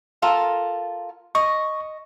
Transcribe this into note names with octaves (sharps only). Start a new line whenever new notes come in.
F4 A4 A#4
D#5 C#6